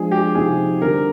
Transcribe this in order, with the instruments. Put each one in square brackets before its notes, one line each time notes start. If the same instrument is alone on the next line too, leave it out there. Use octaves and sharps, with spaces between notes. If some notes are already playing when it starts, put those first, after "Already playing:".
Already playing: [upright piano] F3 G#3 D4 F4 [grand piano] G#4
[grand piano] G4
[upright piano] C3 F3 C4 D#4 [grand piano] G#4
[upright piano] D3 G3 C4 [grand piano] A#4